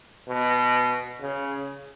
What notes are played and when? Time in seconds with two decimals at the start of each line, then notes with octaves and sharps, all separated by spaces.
0.29 B2
1.21 C#3